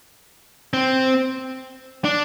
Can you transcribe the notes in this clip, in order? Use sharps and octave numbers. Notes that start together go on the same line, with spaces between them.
C4
D4